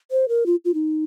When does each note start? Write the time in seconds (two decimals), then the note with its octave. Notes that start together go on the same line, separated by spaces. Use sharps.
0.11 C5
0.28 A#4
0.46 F4
0.65 F4
0.74 D#4